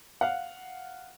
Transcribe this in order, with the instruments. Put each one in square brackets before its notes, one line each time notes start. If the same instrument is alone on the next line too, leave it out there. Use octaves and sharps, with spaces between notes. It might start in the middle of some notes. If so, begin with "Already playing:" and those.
[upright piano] F5 F#5